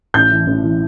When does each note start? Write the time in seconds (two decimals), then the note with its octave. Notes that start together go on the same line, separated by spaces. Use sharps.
0.14 A1 G6
0.31 E3
0.47 A1
0.64 E3